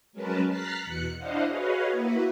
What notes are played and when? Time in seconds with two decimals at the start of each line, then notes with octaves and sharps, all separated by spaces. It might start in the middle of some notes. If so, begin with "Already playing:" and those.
0.13 F#3 G#3 C#4 A#4 B4 A5
0.49 A#5 F6 F#6 A6 B6 C7
0.82 E2 B2 F#6 C#7
1.18 D4 E4 C5 D#5 F5 F#5
1.47 F#4 G#4 B4 C#5 D#5 F5
1.92 A#3 E4 F#4 B4